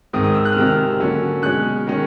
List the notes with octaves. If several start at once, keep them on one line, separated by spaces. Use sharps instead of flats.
G#2 D#3 G#3 C4 D#6
D#6
E6
F#6
F6
C3 D#3 G#3 C4 E6
F6
D3 F#3 A#3 C#4
B2 G#3 C#4 F#6
D#3 G#3 C#4